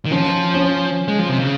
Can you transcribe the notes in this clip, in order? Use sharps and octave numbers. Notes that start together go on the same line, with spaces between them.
D#3
F3 C#4
C#4
G#3
F3
C3
C#3